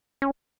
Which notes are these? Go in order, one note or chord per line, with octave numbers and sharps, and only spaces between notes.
C#4